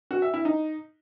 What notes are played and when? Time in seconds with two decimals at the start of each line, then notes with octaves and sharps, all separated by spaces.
0.11 F#4
0.22 E5
0.34 E4
0.45 D#4